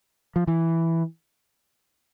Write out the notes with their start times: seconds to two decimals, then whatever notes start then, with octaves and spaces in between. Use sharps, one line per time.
0.36 F3
0.47 E3